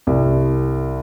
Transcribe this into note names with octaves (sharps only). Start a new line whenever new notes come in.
C2